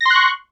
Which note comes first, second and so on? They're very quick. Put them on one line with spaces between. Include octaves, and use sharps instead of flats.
A#6 C6 F#6 C#6